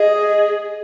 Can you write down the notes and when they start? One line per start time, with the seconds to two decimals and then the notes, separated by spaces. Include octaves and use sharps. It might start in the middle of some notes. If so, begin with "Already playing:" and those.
Already playing: G#4 D#5